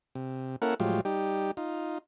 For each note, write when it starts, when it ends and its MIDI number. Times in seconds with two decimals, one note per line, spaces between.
0.15 0.56 48
0.62 0.74 58
0.62 0.74 61
0.62 0.74 64
0.62 0.74 69
0.62 0.74 70
0.62 0.74 78
0.80 1.01 45
0.80 1.01 53
0.80 1.01 54
0.80 1.01 56
0.80 1.01 65
0.80 1.01 67
1.05 1.51 55
1.05 1.51 63
1.05 1.51 67
1.57 1.98 63
1.57 1.98 65